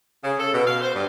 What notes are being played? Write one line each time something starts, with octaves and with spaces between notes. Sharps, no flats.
C#3
A4
B2
F5
C5
G2